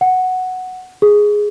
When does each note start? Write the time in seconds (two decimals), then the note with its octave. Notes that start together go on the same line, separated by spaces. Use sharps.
0.01 F#5
1.02 G#4